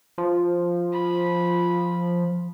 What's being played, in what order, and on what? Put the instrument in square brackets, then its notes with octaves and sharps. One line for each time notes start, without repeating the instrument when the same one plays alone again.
[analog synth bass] F3
[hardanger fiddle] B5